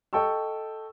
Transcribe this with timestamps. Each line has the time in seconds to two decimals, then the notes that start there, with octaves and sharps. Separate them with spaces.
0.13 A4 D#5 G5 A5 C#6 E6